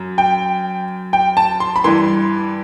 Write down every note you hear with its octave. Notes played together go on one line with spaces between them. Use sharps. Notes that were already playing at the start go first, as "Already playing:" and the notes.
Already playing: F#2
G5
G5
A5
C6
B5
G2 E3 C6